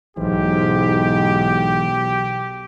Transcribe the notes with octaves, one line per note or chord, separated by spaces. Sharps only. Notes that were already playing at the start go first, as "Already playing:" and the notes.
B1 G#2 E3 G4